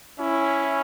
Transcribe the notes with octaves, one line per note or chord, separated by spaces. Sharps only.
C#4 E4